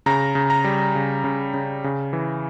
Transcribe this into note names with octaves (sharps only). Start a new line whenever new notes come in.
C#3 A#5
C#3
A#5
G3
C#3
C#3
C#3
C#3
E3